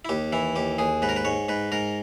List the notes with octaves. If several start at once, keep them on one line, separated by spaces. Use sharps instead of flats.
E4
D#2 G4
E3 E4
D#2 G4
D#2 G#4
G#2 B4
A#4
B4
G#2 C#5
G#2 B4
G#2 A#4